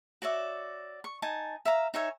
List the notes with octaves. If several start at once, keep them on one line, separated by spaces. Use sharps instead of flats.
F#4 C#5 D5 E5
C#6
D#4 G#5 A5
E5 F5 A#5
D#4 C#5 E5 G#5